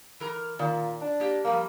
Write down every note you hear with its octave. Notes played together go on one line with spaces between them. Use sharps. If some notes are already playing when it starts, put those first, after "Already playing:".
E3 A#4 A#5
A#2 D#3
D4
A#3 G4
F3 G3 A#3